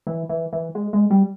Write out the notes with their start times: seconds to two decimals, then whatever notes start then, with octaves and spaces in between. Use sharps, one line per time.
0.07 E3
0.29 E3
0.53 E3
0.75 G#3
0.93 G#3
1.10 G3